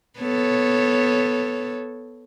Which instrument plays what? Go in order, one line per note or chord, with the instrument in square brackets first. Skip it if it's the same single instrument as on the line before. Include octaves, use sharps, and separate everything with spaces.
[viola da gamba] B3 A4 C#5